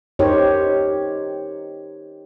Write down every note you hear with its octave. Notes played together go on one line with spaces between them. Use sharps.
D#4 G4 A#4 C5 C#5